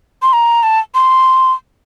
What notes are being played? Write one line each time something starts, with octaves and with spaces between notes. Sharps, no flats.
C6
A#5
A5
C6